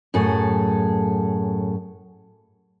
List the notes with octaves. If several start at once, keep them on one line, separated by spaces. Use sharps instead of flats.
F#2 A2 G#4 A4